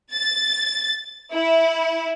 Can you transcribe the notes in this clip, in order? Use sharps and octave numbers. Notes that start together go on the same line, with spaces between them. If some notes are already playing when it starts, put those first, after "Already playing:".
A6
E4